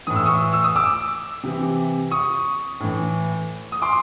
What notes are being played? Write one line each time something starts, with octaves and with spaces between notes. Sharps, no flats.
A2 E3 D#6
E6
C#6 D#6
E6
D#6
D6 E6
C3 E3
C#6 D#6
A2 E3
D#6
C6 D6